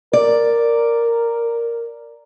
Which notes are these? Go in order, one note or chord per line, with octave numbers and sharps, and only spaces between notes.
A#4 D5